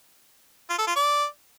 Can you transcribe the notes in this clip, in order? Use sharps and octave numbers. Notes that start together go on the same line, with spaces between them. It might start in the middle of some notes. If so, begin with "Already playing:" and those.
F4
A4
F4
D5